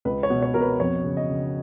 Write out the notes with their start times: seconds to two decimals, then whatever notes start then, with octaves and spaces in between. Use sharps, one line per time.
0.05 C#2 B4
0.23 C#5
0.30 B2
0.42 C#5
0.54 B2 A#4
0.61 B4
0.80 F2 C#5
1.04 C#3
1.17 D#5
1.29 C#3